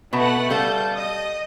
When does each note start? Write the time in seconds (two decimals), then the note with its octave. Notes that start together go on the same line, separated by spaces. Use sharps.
0.13 B2 A3 B3 B4 F#5 A5
0.50 G3 A4 F5 A5 G6
0.95 D#5 D#6